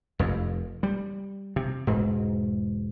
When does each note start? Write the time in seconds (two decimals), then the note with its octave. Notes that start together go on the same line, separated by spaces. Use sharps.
0.19 F1 F2
0.83 G3
1.56 C3
1.87 E1 G#2